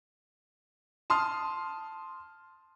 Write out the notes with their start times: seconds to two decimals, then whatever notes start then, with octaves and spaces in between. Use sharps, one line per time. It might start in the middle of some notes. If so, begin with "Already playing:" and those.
1.10 A5 C6 D#6 F6